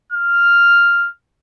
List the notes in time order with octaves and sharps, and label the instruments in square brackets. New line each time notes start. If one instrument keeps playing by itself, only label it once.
[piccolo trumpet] F6